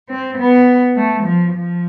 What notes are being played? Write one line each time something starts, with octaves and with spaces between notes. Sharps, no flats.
C4
B3
A3
F3
F3